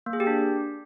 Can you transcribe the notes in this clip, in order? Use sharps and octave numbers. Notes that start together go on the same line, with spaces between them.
A#3
G#4
G4
D4